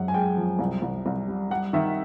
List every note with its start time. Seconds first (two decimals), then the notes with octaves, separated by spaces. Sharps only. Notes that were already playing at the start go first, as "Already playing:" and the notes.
Already playing: F#2 G#3 F#5
0.08 G#5
0.14 G#3 G5
0.37 F3
0.59 C2
0.82 C2
1.06 C2
1.28 G3
1.50 G3 F#5
1.73 D#3 E5